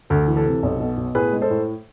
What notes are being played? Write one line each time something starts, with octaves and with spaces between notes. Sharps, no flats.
D2 A4
E3
A4
C3
B1
B2
B2
A2 G#4 B4
G#3
A4 C5
A2